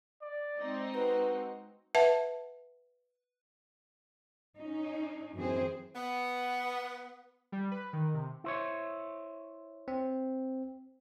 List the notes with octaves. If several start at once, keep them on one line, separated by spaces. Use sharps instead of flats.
D5
G#3 C4 D#4
F#4 B4
B4 E5 F#5 A5
C#4 D#4
F#2 E3 C4 G#4 C5
B3
G3
B4
D#3
C3
E4 C5 C#5
C4